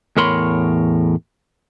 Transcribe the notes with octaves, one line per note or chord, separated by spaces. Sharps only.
E2 A2 A#4 C#5 B5 C6